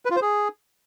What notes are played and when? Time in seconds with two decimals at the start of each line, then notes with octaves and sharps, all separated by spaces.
0.05 B4
0.11 F4
0.16 C5
0.21 G#4